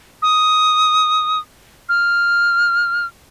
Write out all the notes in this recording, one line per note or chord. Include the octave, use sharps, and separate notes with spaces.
D#6
F6